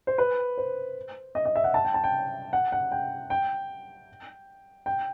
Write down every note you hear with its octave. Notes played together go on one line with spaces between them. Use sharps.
C5
B4
C5
D#5
D#5
E5
F#5
A5
G5
A5
G5
F#5
F#5
G5
G5
G5